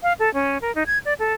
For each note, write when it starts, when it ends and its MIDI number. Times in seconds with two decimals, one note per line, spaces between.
0.03 0.13 77
0.19 0.32 69
0.34 0.58 61
0.62 0.74 70
0.75 0.83 63
0.87 0.98 92
1.05 1.14 74
1.19 1.33 69